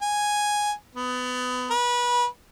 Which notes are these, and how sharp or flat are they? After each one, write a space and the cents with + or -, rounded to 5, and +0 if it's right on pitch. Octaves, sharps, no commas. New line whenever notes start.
G#5 +0
B3 +25
B4 -25